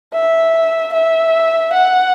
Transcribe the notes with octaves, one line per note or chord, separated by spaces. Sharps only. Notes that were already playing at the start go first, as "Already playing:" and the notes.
E5
E5
F#5